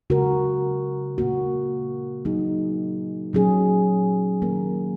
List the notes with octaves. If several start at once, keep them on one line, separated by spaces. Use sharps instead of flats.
C#3 G#3 F#4 A#4
A#2 A#3 F#4
A#2 F#3 A#3 D#4 G#4
A#2 F#3 C#4 G#4
D#3 A#3 C#4 A#4